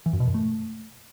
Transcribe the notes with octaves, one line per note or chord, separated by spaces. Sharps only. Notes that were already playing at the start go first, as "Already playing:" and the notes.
E3
F#2
B2
F#2
A3